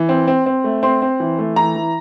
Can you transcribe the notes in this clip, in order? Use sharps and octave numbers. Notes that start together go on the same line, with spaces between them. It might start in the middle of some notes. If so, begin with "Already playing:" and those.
Already playing: E3
C4
C4
C4
A3
C4 C6
C4
E3
A3
E3 A#5
E3